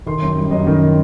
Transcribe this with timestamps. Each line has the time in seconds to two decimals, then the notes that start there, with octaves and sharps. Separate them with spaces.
0.06 D#3 C6
0.22 F#2
0.37 G3
0.51 F#2 D#5
0.67 D#3